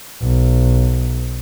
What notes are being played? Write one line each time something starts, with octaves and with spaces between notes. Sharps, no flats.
B1